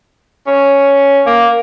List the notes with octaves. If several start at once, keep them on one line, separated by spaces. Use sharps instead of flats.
C#4
A#3